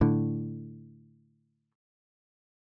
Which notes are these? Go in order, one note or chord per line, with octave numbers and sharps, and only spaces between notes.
A2 D3